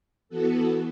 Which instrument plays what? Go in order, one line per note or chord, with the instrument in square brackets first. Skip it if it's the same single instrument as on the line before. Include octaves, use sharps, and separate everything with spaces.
[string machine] E3 B3 F#4 A4